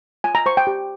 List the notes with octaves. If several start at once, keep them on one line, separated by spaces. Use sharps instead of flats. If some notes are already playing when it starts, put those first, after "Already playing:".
F4 G#5
A#5
C5 C#6
G5
G4